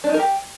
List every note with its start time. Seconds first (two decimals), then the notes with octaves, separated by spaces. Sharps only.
0.04 D4
0.09 D#4
0.14 A#4
0.19 G4